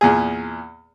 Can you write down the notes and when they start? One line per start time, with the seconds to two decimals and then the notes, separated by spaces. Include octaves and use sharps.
0.01 E2 A#2 G#4